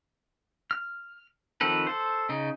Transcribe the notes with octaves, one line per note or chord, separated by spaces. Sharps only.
F6
D#3 F3 C4 A4 B4
A4 C5
C#3 D#4